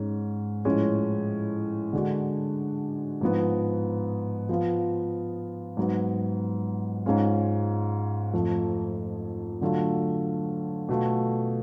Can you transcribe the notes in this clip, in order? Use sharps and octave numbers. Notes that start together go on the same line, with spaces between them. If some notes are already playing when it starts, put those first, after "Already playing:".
Already playing: G#2 G#3 C#4
A2 F3 G#3 C#4
D3 G#3 D4 F#4
G#2 F3 B3
F3 B3 F4
G#2 F#3 B3
G#2 G#3 C#4 F4
F2 F3 A3
D3 F#3 A3 F4
B2 A3 F4